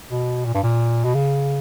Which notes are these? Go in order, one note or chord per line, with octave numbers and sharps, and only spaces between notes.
B2
A#2
G2
A#2
B2
C#3